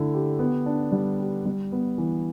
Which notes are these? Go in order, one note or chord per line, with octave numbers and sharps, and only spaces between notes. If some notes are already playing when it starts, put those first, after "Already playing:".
Already playing: D3 A3 E4
G4
B3
D4
G3
G4
G3
B3
E3